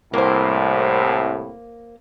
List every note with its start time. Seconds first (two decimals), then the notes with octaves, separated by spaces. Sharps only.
0.14 C2 A2 A#3 C5